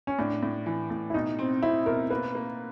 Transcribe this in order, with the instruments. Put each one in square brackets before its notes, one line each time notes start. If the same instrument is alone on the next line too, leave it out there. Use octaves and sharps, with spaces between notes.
[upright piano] C#4
[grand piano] A2 [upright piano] D4
[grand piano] A2
E3
A2
[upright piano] E4
[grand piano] B2 [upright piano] D#4
[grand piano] C4
[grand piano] C4 [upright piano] E4
[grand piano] B2 [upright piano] A#4
[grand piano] A#3 [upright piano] B4
[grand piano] A#3